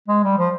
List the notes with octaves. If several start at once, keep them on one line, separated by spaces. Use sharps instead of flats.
G#3
G3
F3